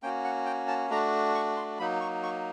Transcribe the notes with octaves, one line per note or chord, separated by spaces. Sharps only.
A#3 C#4 F#4 G5
F#5
G5
A5
A3 D4 F#4 A#5
C#6
C6
F#3 A#3 D#4 B5
C#6
C#6